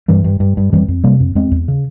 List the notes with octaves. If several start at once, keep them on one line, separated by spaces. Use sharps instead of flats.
G2 E3 G3
G2
G2
G2
F2 E3 G3
F2
C3 G3 A#3
F2
E2 G#3 C4
E2
C#3